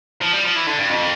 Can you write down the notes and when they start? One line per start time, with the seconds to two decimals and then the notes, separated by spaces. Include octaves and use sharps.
0.22 F3
0.33 G3
0.44 F3
0.56 E3
0.67 D3
0.78 G2
0.89 F2